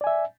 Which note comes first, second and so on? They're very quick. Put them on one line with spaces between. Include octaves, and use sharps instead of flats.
D5 G#5 E5